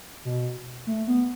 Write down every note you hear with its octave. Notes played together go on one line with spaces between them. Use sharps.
B2
A3
B3